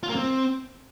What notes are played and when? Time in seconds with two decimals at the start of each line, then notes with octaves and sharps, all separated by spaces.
0.03 F4
0.09 A#3
0.15 C4